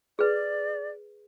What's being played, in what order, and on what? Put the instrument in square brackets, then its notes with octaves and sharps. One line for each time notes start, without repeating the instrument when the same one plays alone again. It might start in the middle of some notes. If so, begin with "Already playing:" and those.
[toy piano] G#4 B4 [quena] D5